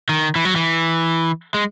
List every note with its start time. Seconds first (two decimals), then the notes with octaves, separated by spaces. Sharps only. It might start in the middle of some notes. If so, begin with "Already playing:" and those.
0.09 D#3
0.36 E3
0.45 F#3
0.56 E3
1.54 G#3